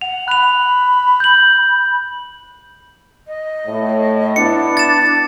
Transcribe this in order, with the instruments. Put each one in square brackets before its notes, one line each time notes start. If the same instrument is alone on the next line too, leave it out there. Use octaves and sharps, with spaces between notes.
[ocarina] F#5 [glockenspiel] F7
[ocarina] B5 [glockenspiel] F#6 F7
[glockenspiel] G6 F#7
[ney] D#5
[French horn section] A2
[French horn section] B3 E4 [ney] D4 [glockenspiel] C#7
[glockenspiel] A6 E7